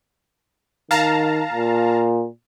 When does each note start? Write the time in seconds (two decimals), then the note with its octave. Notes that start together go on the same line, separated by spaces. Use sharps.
0.91 D#3 F5 A5 A#5
1.53 A#2